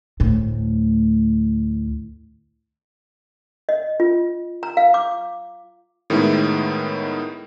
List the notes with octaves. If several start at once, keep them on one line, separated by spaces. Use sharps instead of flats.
D2 A2
D#5
F4
A#5
F5
D6
A2 D#3 G#3 B3 E4